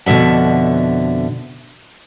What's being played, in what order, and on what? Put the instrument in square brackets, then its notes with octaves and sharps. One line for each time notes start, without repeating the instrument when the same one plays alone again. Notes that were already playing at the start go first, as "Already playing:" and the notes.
[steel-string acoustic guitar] F2 B2 D3 E5 F#5